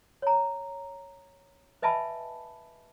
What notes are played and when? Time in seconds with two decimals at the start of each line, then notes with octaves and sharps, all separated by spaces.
0.22 C#5 A#5
1.82 B4 D#5 E5 G#5 A5 B5